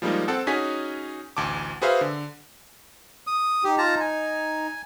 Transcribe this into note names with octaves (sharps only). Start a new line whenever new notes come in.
F3 G3 G#3 A#3 D#4
C4 A4 F#5 A5
C#4 D#4 F#4 G#4 G#5 B6
A1 D2 A5 D6
F#4 G#4 B4 C5 E5 F5
D3
D#6
D#4 G4
F4 A5 A#5
G#5